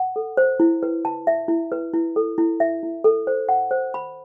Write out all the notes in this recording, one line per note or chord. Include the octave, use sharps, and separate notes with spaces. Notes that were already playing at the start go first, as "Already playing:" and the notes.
Already playing: F#5
A4
C5
E4
B4
A5
E5
E4
B4
E4
A4
E4
E5
E4
A4
C5
F#5
C5
B5